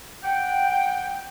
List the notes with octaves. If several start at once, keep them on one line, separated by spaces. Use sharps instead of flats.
F#5 G5